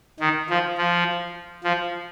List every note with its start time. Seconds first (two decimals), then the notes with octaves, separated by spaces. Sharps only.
0.20 D#3
0.50 F3
0.78 F3
1.64 F3